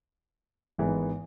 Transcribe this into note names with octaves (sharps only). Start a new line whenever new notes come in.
G#1 G#2 E3 G#3 B3